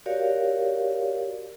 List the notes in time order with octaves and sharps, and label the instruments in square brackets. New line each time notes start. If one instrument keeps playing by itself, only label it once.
[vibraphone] F#4 G4 A#4 C#5 D5 F5